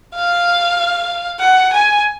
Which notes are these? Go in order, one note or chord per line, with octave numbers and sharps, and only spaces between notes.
F5
F#5
G#5